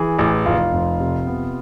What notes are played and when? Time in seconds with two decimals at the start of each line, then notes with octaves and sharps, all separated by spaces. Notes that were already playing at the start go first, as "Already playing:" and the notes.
Already playing: E3 G#4
0.19 A1
0.46 F1 F4
0.73 F2
1.00 C3
1.27 B3